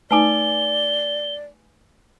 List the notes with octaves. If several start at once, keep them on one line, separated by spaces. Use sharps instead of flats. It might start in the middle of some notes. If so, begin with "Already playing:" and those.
A3 D#4 B4 D5 G#5 D6 G7